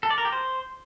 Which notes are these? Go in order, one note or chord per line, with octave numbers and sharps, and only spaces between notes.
A4
D5
A#4
G4
C5